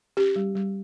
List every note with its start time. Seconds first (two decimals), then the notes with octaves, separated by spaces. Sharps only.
0.17 C#4 G4
0.36 G3
0.55 G3